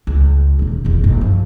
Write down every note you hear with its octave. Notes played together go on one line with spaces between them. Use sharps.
C#2
D#1 C#3
E1 A1
F#1
F3